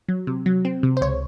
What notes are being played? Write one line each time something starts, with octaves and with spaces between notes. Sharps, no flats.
F#3
C3
F#3
C4
C3
C5
C#2 C#5